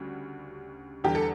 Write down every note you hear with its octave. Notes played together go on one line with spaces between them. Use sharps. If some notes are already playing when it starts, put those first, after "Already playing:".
Already playing: D2 C#3 G3 F#4
E2 D3 G3 G4
A4